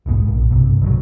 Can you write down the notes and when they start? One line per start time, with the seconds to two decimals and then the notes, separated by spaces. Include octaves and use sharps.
0.06 E1 B1 G#2 B3
0.28 A#1
0.50 B1 G2 C3
0.82 B2 D3 F3 F#3